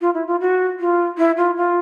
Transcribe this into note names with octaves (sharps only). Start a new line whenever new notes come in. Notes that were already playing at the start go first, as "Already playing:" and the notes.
F4
E4
F4
F#4
F4
E4
F4
F4